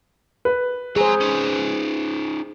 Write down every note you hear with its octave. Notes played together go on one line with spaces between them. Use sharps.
B4
G#4 C5 C#5 A#5
C#4 D#4